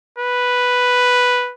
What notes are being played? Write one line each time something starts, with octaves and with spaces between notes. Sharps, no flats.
B4